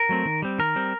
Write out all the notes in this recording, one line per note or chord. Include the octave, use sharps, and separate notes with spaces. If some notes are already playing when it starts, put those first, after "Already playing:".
Already playing: A#4
F#3 A3 C4
D#3
G3 C4
D#3 A#4
G3 C4